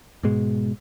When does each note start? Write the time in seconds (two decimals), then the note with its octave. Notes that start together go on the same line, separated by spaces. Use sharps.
0.23 G#2 B2 G#3